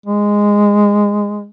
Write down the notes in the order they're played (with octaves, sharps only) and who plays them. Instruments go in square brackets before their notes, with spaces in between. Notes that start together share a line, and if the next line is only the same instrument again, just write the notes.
[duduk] G#3